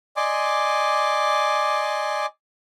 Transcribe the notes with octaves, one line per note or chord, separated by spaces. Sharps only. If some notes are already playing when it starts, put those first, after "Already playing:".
D5 D#5 G#5 C6 D6